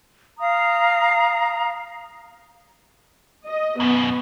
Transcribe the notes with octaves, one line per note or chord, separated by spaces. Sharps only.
F5 A#5 D#6
D#5
F#2 B2 B3